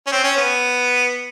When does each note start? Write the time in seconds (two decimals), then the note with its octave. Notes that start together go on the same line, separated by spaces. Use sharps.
0.07 C#4
0.12 C4
0.24 C#4
0.37 B3